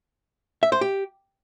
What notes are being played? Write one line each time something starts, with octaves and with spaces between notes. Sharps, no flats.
E5
C5
G4